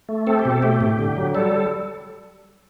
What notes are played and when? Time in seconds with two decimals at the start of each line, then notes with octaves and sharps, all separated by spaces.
0.09 A3
0.27 C4 A4
0.39 G4
0.45 B2
0.51 A4
0.63 A3 G4
0.80 A2
0.99 D3
1.17 F#3
1.35 G3 A4